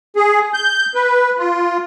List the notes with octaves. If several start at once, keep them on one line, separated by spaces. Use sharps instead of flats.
G#4
G6
B4
F4